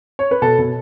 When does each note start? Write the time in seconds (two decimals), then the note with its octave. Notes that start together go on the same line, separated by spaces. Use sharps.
0.19 C#5
0.31 B4
0.42 B2 A4
0.58 B2